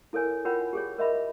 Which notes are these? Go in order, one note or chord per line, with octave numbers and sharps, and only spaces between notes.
E4 A4 A#4 C#5 G#5
F4 A#4 C#5 F#5 G5 B5
G4 G#4 C#5
A#4 D#5 E5 B5